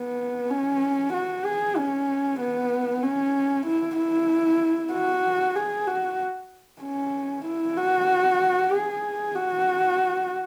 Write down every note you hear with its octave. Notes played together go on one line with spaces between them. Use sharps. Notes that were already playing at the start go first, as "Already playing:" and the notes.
Already playing: B3
C#4
F#4
G#4
C#4
B3
C#4
E4
E4
F#4
G#4
F#4
C#4
E4
F#4
G#4
F#4